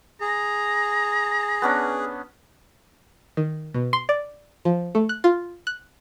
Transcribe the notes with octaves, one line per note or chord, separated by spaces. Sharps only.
G#4 A#5
B3 C#4 D4
D#3
B2
C6
D5
F3
A3
F#6
F4
F#6